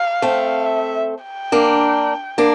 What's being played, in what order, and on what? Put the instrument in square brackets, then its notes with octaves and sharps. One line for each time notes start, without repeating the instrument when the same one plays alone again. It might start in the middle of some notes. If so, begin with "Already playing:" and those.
Already playing: [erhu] F5
[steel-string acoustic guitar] A3 C4
[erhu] E5
G5
[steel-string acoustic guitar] A#3 D4
A#3 D4